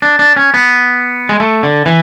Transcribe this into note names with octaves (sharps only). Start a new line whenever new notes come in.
D4
D4
C#4
B3
G#3
A3
D3
E3